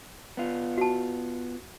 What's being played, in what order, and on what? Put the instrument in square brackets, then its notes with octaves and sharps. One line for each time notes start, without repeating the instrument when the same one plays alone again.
[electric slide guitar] B3 F4
[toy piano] F#4 A5